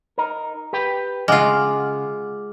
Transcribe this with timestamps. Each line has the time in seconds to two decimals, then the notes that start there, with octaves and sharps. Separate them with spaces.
0.18 D#4 A#4
0.73 G4 B4 G5
1.28 C#3 G#3 F4 F#5 D6 F6